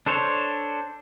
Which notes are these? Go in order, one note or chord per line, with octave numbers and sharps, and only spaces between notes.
D4 A4 C5 C#5